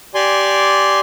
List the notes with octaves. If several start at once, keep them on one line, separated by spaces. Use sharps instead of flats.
G4 D5 G#5 C6